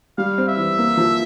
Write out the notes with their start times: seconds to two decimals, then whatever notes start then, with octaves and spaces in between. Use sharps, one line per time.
0.18 G3 F5
0.38 C4
0.48 E5
0.57 E3
0.78 A#3
0.97 F3